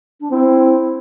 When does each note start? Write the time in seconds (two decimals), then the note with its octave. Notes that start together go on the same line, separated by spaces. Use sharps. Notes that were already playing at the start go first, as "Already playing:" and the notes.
0.21 D4
0.31 C4 E4